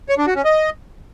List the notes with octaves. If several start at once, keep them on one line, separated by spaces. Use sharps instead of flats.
C#5
D4
F#4
C#4
D#5